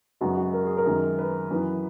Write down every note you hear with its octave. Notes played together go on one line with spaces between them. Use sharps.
F#2 C#3 G#3 B3 F#4
F#4
A#4
G#4
A#4
F#2 D#3 G#3
B4
F#2 E3 B3